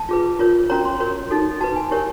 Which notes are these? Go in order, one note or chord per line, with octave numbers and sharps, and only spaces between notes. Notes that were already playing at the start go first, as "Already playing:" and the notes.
Already playing: A5
F4 G#4 B4
F4 A#4 C#5
C#4 F#4 A#4 C#5 A#5
C6
F#4 A#4 C#5
D#4 F#4 A4
F#4 B4 A5
G#5
E4 G4 A#4 C#5